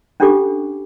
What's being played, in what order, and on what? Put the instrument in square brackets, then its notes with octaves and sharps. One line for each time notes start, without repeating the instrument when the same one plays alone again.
[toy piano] C#4 D4 F4 G4 A4 D6